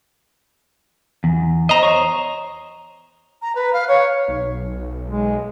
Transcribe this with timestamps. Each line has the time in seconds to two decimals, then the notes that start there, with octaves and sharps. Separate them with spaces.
1.24 E2
1.69 C5 D#5 A#5
1.83 C5 C#5
3.42 A#5
3.55 B4
3.73 F5
3.88 C#5
4.28 B1
5.09 G#3